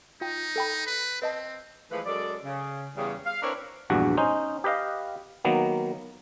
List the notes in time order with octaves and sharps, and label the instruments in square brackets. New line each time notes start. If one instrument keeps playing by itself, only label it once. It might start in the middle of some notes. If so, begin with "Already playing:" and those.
[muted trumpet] D#4 [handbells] F4 G5
[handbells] A4 G5 B5
[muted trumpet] B4
[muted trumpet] C4 [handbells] B4 D#5 A5
[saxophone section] E3 F3 G#3 A3 B4
F#2 G#3 A4 D5
C#3
E2 C#3 G3
F5
C4 D4 E4 A#4 B4 C#5
[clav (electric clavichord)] A#1 E2 G2 F#4
C#4 D#4 C5
G4 B4 D#5 F5
D#3 F#3 A#3 B3